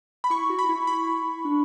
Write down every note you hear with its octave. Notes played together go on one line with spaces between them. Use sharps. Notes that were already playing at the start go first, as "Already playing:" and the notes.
B5
E4 C#6
F#4
B5
E4
B5
D4